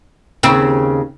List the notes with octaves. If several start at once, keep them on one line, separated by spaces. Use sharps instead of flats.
D#2 C#3 C4